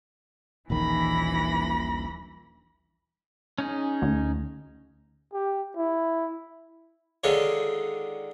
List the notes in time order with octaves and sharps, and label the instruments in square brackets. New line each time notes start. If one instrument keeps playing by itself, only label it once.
[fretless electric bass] D#1 A#1 D#3 [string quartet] E3 B5 A#6
[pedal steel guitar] C#4 D#4 G#4
[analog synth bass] D2
[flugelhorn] G4
E4
[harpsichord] D3 D#3 G#3 F4 C#5